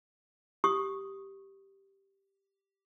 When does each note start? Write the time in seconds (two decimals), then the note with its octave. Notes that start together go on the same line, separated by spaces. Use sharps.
0.64 G4 C#6 D#6